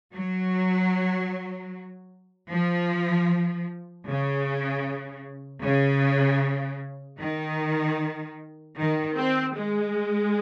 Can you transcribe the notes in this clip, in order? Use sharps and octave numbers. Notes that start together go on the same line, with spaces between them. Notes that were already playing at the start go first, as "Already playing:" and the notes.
F#3
F3
C#3
C#3
D#3
D#3
C4
G#3